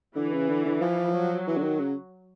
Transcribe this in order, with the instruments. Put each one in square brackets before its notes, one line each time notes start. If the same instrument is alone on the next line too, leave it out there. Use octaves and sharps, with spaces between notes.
[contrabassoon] D3 [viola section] E3
[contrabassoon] C#3
D3
D3
F3
[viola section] F#3
[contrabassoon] E3
D3
D#3
C#3